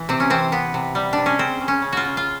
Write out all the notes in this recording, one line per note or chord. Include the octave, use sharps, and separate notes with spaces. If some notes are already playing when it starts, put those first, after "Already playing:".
Already playing: E3
C3 C4
C#4
E3 C4
C3 B3
C3
G3
C3 D4
C#4
C#3 C4
C#3
C#4
C#3
F4 F#4
C#3
F4